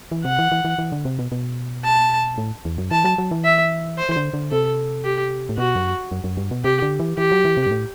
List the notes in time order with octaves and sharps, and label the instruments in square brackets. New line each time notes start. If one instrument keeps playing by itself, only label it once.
[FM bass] E3
[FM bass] C3 [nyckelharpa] F#5
[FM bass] E3
E3
E3
E3
D3
C3
B2
B2
[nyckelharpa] A5
[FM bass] A2
E2
F#2
[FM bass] E3 [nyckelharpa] A5
[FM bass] F#3
F#3
E3
[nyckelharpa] E5
C5
[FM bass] E3
D3
D3
[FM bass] C3 [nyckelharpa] A4
[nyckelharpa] G4
[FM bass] A2
[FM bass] B2 [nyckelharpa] F#4
[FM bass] F#2
F#2
F#2
G2
B2
[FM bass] C3 [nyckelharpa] G4
[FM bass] D3
E3
[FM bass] E3 [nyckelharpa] G4
[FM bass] F#3
E3
C3
G2
A2